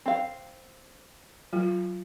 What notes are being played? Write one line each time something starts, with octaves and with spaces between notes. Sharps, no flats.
C4 F5
F#3 F4